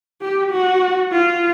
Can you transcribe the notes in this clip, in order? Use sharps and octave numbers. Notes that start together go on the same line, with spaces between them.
G4
F#4
F4